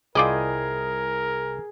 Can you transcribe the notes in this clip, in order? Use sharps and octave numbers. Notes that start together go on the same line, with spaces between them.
C2 E4 F4 G#4 A#4 D5 D#5 G5